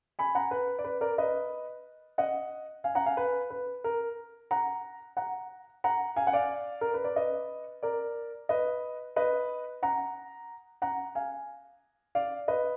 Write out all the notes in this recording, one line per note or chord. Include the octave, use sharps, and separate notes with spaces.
G#5 B5
F#5 A#5
B4
D5
B4
A#4 D5
B4 D#5
D#5 F#5
F5 G#5
F#5 A#5
F5 G#5
B4
B4
A#4
F#5 A#5
F#5 A#5
F#5 A#5
F5 G#5
F#5
D5 F5
A#4
B4
D5
B4 D#5
A#4 D5
B4 D#5
B4 D#5
F#5 A#5
F#5 A#5
F5 G#5
D5 F5
B4 D#5